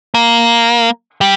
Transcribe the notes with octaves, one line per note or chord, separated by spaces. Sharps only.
A#3
G3